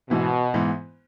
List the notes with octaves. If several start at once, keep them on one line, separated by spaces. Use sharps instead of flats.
G#2 B2 E3 B3
G#2 E3 B3